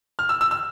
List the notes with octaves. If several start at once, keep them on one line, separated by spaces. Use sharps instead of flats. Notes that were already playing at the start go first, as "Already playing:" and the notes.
F6
E6
E6
E6